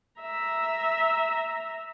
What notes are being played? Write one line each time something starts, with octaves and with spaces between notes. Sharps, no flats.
E5 A#5